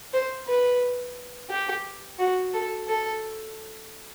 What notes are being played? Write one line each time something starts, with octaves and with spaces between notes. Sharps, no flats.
C5
B4
G4
F#4
A4
A4